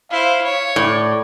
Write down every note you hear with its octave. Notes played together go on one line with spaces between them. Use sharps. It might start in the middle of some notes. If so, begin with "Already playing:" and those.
E4 C5 F5
C#5
A2 D5